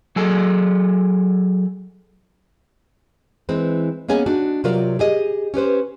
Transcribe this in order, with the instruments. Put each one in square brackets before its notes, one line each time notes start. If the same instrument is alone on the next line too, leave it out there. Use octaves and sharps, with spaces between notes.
[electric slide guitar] F#3 G#4 A4 G#5
[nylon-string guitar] E3 G#3 C4
A#3 B3 C#4 G#4 D#5 G#5
D4 D#4 F#4
C3 F#3 F4 A#4 D5
G4 G#4 D#5
C#4 G4 B4 C5